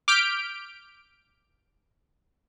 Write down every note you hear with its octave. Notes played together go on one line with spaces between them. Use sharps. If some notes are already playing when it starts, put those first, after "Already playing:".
D6 F6 G6 B6 D7